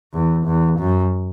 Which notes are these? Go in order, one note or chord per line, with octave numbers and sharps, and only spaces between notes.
E2
E2
F#2